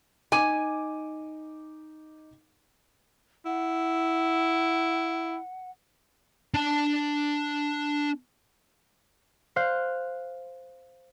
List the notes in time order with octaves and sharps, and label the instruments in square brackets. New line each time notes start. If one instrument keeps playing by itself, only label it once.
[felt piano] D#4 D6 D#7 [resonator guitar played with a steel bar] G#5
[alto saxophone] E4 [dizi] F#5
[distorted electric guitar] D4 A5
[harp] C5 F5 F#6